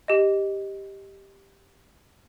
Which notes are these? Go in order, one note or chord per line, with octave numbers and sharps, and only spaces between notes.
G4 D#5